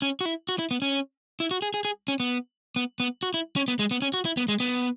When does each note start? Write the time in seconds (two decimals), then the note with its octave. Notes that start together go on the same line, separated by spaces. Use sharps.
0.02 C#4
0.21 F#4
0.25 E4
0.49 F#4
0.59 E4
0.71 B3
0.82 C#4
1.40 E4
1.51 F#4
1.62 G#4
1.74 G#4
1.85 G#4
2.08 C#4
2.20 B3
2.76 B3
3.00 B3
3.23 F#4
3.34 E4
3.56 C#4
3.68 B3
3.79 G#3
3.91 B3
4.02 C#4
4.14 F#4
4.25 E4
4.37 B3
4.48 G#3
4.60 B3